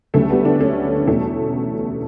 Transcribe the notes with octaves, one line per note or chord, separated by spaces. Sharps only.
D2 C#3 G3 A3
G3 B3
B3 D4
A3 C#4
E2 B2 G3 A3 C#4